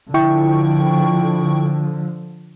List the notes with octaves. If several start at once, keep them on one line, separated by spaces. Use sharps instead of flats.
D3 F3 E4 G5 C#6